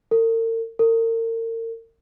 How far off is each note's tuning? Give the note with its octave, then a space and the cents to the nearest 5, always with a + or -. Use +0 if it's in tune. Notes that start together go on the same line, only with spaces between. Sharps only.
A#4 -45
A#4 -40